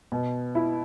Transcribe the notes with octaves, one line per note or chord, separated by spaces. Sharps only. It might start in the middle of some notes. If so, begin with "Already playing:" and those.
B2
E4